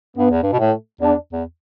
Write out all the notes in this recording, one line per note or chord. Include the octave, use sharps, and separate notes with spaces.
G2 B3
E2
G2
B2
A2 A3
E2 D4
E2